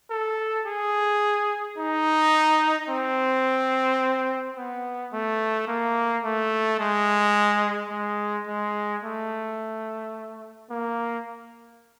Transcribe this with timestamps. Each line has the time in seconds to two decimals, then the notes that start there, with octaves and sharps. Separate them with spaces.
0.10 A4
0.66 G#4
1.78 D#4
2.89 C4
4.56 B3
5.13 A3
5.68 A#3
6.24 A3
6.79 G#3
7.91 G#3
8.47 G#3
9.03 A3
10.70 A#3